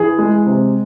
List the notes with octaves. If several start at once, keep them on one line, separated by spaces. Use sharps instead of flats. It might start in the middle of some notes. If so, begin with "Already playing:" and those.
Already playing: E3 G#4
G#3
C3